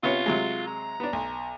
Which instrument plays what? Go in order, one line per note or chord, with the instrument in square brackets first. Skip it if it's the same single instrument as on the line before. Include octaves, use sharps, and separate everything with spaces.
[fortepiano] C3 B3 C#4 [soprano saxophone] F4
[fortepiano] C3 F#3 G#3
[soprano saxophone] A#5
[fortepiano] B3 D4
B1